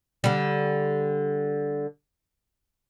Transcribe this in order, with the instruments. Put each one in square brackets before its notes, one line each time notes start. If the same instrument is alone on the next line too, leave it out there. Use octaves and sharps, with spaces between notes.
[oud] D3 G3